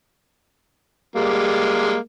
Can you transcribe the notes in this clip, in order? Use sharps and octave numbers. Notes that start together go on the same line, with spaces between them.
G3 G#3 A#3